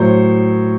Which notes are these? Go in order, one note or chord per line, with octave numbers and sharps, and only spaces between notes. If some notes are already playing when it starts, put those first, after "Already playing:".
Already playing: A2 F#3 C5 C#5